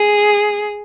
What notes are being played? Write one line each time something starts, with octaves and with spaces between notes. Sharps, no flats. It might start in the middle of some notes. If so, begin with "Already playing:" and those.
Already playing: G#4